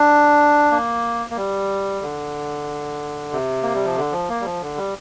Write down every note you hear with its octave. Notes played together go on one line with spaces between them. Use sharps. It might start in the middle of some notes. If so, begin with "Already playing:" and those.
Already playing: D4
A#3
A#3
G3
D3
C3
A#3
G3
F3
D3
F3
A#3
G3
F3
D3
G3